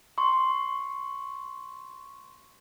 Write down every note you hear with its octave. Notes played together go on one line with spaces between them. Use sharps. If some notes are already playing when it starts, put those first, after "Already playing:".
C6 C#6